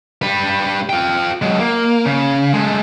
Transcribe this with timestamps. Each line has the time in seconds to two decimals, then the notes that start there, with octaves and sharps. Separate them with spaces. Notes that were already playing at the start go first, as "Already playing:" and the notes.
0.22 G3 B4
0.89 F4 G5
1.42 F#3 G#3
1.60 A#3
2.05 C#3
2.53 G#3 A3